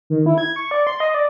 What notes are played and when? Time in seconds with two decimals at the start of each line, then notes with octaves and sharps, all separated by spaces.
0.10 D#3
0.26 E4
0.38 G#6
0.56 C#6
0.71 D5
0.87 C6
1.00 D#5
1.14 D5